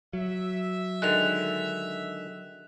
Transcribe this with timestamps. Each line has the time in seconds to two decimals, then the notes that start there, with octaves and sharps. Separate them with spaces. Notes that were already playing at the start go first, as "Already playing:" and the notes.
0.13 F#3 E5
1.02 D3 D#3 G#3 F#6 F7